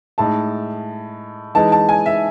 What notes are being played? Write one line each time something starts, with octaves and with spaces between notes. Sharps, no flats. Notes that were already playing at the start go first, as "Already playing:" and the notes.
A2 G#3 D#4 A5
E3 G#3 D#4 A5
A5
G#5
E5